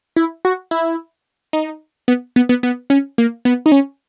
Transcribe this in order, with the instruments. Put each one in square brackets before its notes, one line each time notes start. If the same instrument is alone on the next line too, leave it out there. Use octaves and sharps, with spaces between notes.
[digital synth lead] E4
F#4
E4
D#4
B3
B3
B3
B3
C#4
A#3
B3
D#4
C#4